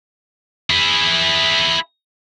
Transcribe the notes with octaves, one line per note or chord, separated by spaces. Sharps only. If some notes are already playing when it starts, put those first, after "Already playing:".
E4 G#4